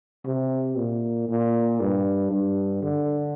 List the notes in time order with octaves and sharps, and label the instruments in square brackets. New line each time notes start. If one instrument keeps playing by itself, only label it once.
[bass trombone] C3
A#2
A#2
G2
G2
D3